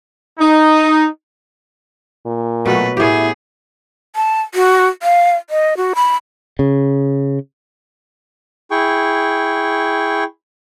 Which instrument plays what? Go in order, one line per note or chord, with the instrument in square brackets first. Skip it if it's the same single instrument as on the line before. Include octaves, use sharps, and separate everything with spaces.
[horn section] D#4
[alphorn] A#2
[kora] B2 F#3 [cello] A3 B4
[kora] A2 G4 [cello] B3 G#4 [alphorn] E4
[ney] A5
F#4
F5
D#5
F#4
B5
[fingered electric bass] C#3
[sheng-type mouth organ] E4 G#4 G5 C#6